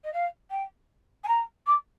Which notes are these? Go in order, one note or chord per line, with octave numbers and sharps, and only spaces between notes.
D#5
F5
G5
G#5
A#5
D6